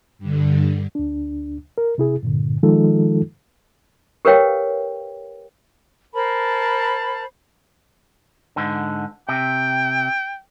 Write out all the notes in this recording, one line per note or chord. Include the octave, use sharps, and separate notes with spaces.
G2 D3
D2 D4
A#4
C3 E4 G#4
G2 A#2 D3
D#3 F3 G#3 D#4 F4 A4
G4 A#4 B4 C#5 F5 G5
A#4 C5 A5 B5
G#2 D3
C3 G5